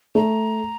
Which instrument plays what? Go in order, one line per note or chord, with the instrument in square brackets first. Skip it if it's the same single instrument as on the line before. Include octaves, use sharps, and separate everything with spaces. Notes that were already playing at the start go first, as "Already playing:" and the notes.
[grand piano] A3 [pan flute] A#5